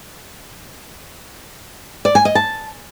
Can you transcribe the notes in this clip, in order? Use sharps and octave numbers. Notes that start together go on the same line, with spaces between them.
D5
G#5
D#5
A5